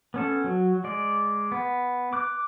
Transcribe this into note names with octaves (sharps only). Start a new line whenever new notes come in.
B3 C#4 A4
F#3
G#3 D5
B3
D6 F#6